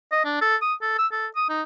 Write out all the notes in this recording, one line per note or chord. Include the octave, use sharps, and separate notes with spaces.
D#5
D4
A4
D#6
A4
E6
A4
D#6
D#4